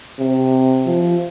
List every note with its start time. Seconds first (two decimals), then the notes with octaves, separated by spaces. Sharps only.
0.20 C3
0.86 F3